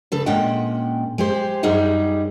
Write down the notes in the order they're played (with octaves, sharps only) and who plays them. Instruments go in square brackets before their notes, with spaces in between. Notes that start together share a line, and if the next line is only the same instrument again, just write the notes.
[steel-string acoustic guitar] C#3 A4 B4
A#2 G#3 C#4 F#5 G5
G#3 G4 C5
F#2 G3 D#4 G#4 F#5